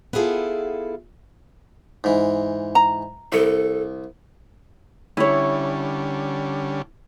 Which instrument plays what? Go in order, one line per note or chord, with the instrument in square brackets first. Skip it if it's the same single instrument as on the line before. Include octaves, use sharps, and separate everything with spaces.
[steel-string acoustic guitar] B3 E4 F4 G#4 A4
[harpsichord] G#2 E3
[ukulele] A#5
[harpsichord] C2 [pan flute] A4
[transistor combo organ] D3 G3 C#4 [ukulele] E4 C#5